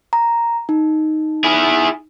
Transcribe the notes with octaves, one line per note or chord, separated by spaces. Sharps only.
A#5
D#4
E4 G#4